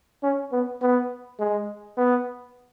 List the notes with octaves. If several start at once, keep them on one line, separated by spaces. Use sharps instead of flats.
C#4
B3
B3
G#3
B3